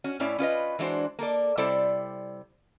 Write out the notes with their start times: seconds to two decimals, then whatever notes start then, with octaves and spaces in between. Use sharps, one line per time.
0.04 C#4 F#4
0.20 A2 C#4 E4 C#5 D5
0.38 C#4 F4 B4 D#5
0.79 E3 G#3 D4 F#4 C5
1.19 A#3 A4 D5
1.57 C3 G3 E4 A4 C5 D5